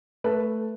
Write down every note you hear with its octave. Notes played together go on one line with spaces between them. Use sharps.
A3 A4 B4